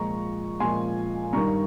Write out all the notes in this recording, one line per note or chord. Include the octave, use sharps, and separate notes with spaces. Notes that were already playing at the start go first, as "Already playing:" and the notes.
Already playing: A#2 F3 G#3 A#5 C#6
A#2 F3 G#3 G#5 C6
G2 D#3 G3 A#5 C#6